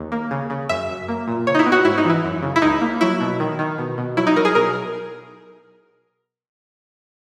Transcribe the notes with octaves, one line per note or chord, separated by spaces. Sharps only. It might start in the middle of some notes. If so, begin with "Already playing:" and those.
Already playing: D#2
A#3
C#3
C#3
F#2 E5
F#2
A#3
A#2
C#3 C#5
D#4
E4
B3
F#4
G#2 E4
D#4
E3 E4
F#2
C#3
E4
C#2 D#4
A#3
F#3 E4
B2
D#3
D#3
B2
B2
F#3 E4
D#4
F#3 A#4
G#4
B2 A#4